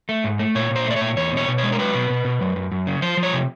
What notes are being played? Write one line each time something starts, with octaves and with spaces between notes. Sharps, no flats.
A3
G#2
A3
A#2 C#5
A#2 C5
A3 D5
C#5
A#2
E2 C#5
B2 C#5
B2
C#5
G#3
A#4
F#3 B4
B2
B2
B2
F#2
F#2
F#2
C#3
F3 C5
F3
C#5
C3